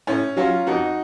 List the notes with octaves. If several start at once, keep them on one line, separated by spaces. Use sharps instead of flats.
A2 C#4
F#3 C#4 F4
F2 D#4 F#4